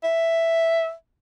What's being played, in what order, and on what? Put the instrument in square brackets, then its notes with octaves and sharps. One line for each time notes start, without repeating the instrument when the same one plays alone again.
[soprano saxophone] E5